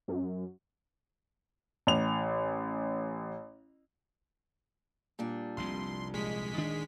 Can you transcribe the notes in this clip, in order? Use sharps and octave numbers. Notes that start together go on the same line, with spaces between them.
F#2
A1 F7
A#2 G3 D4
F1 C2 F2 C6
A#1 G#3 B6
D2 D#3 D4